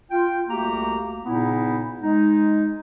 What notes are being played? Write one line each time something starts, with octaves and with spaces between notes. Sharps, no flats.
F4 G5
C2 A3 A#3 F#4 G4 A#5
A#2 C#3 B3 D#4 E4
G#3 D#4